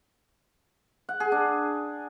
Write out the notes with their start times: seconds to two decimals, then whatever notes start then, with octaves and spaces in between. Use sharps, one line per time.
1.09 F#5
1.20 G#4
1.32 D4